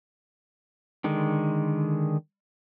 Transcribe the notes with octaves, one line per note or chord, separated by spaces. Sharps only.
D3 D#3 G#3